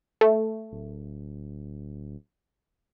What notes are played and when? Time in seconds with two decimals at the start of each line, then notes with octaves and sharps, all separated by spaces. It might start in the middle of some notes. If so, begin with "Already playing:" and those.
0.21 A3
0.72 D1